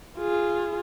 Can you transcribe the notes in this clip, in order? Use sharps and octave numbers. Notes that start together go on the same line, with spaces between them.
F4 G#4